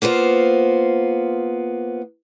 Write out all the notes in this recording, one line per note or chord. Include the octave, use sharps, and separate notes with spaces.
A#3 B3 F4 C5